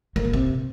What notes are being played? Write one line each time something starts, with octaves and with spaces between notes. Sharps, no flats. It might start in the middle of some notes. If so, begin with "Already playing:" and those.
A#3
B2
C3